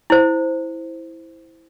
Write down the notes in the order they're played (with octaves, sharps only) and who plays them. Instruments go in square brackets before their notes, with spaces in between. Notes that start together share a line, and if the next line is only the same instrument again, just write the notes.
[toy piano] E4 C5